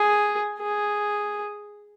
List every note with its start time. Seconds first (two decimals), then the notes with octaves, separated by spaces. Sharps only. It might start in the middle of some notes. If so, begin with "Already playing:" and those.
Already playing: G#4
0.60 G#4